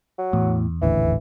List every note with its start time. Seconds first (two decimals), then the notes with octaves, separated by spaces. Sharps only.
0.18 F#3
0.33 E2 A2
0.82 D#1 A1 D3 E3